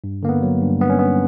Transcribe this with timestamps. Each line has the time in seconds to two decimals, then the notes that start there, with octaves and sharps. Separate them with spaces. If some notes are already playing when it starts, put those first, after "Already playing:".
0.04 G2
0.23 D3 A#3
0.29 B3
0.42 F#3
0.62 G2
0.80 G2 B3
0.90 C#4
0.99 G2 B3